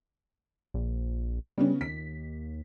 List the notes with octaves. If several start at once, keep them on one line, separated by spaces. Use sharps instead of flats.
A#1
C#3 G3 B3 C#4
D#2 B6